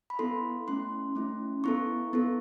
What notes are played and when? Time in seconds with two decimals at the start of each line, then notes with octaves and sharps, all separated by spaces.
0.10 B5
0.19 B3 E4 A4 C6
0.67 A3 C#4 E4 C6
1.15 A3 C#4 E4
1.64 B3 E4 A4 C#6
2.13 B3 E4 A4